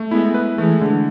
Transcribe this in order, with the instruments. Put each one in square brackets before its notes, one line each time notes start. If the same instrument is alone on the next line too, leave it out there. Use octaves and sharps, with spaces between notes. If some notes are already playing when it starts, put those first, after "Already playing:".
Already playing: [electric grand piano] A3
[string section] G#3 B3 [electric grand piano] E4
[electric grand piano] B4
[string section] E3 G#3 [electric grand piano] A3
[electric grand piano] D3